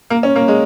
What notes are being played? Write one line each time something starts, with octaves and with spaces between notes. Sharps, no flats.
A#3
C#4
A#3
G#3